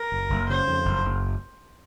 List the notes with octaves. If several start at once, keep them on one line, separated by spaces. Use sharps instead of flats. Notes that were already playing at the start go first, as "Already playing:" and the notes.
Already playing: A#4
F#1
F#1
C#3 C5
F2
F#1
F#1